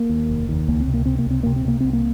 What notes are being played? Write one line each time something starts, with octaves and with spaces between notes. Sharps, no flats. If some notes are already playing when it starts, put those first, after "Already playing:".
Already playing: A#3
D#2
F1
D#2
C#2 A#3
C4
C3
A#3
C3 C4
A#3
C#2 C4
C3 A#3
C4
C3 A#3
C2 C4
A#3